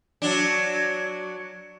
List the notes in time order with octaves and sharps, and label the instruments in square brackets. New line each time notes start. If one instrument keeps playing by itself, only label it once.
[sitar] F#3 D4